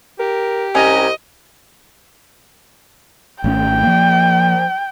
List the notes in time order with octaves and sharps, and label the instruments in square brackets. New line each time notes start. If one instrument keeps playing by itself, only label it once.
[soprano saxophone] G4 [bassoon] A#4
[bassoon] C2 [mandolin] C#4 A#5 [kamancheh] D#5
[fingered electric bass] G#1 A3 C#4 [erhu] G5
[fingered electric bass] F3 A#3